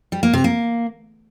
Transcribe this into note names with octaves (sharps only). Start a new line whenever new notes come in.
G3
A#3
C3
A#3